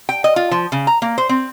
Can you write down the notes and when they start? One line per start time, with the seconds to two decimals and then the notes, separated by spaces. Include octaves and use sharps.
0.09 G5
0.24 D#5
0.36 F4
0.51 F3
0.72 C#3
0.87 A#5
1.02 A#3
1.18 C5
1.29 C4